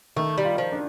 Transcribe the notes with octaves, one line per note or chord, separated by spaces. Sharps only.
D#3 A3
G3
F4
F3
D4